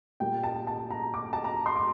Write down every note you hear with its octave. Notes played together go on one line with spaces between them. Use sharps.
A#2 G3 A#3 G5
A5
A5
A#5
D6
A5
A#5
C6
D6